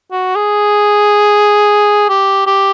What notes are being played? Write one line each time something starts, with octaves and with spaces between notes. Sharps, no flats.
F#4
G#4
G4
G4